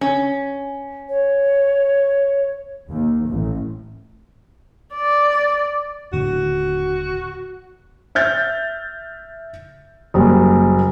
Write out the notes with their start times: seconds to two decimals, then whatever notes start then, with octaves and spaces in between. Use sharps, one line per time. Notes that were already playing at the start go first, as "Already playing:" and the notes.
0.01 C#4
1.09 C#5
2.89 D#2
3.27 A1
4.95 D5
6.13 D#1 A2 D3 F#4
8.15 E5 F6 G6 A6
10.14 F#1 G3 A#3